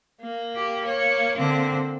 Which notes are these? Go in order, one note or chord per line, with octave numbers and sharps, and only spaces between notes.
A#3
G4
C#5
D3 C4